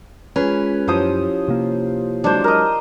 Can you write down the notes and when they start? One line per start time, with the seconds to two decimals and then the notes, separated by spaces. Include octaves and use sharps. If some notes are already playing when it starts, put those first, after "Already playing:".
0.36 G#3 C#4 F4 G#4 B4
0.88 F#2 F3 E4 G4 C5 C#5 D#6
1.48 C3 A#3
2.24 F#3 G#3 D4 C5
2.44 A#4 D#5